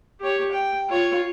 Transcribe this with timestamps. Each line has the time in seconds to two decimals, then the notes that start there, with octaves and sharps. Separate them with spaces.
0.20 G4 C#5
0.52 G5
0.89 F4 C#5